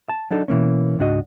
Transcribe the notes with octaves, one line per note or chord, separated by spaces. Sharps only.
A5
F#3 D4 D#4 A4
B2 E3 A#3 C#4
C#2 G#2 D4 F#4 D#5